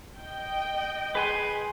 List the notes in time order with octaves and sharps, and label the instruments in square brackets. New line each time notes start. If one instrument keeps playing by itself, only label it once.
[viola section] D#5 G5
[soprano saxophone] G#4 [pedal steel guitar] B4 G#5 C6